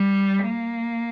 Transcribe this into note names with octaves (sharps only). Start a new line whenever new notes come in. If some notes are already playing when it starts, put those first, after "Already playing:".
Already playing: G3
A#3